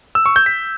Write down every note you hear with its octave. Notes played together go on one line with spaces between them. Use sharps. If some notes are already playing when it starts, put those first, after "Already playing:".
E6
C#6
G6
B6